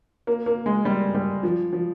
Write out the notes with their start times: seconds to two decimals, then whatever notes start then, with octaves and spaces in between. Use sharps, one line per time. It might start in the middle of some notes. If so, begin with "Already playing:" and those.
0.27 A#3
0.46 A#3
0.66 G#3
0.85 G3
1.15 G3
1.43 F3
1.73 F3